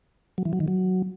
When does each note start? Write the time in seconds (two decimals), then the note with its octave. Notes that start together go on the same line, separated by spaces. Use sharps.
0.38 F#3
0.45 E3
0.53 F#3
0.60 D#3
0.68 F#3